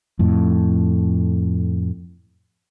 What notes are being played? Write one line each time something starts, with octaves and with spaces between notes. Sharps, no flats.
F2 A2